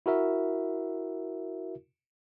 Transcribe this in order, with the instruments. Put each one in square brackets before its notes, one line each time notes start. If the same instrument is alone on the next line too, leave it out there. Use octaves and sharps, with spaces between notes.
[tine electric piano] E4 F#4 A#4 E5